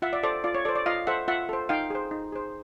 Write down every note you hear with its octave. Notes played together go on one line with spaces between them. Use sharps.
F4 E5 F#5
D5 E5
A4 C5 D5
F4 D5
C#5
A4 C5 D5
D5
F4 D#5 F5
A4 C5 E5 F#5
F4 E5 F#5
A4 C5
D#4 F5 G5
G#4 C5
D#4
G#4 C5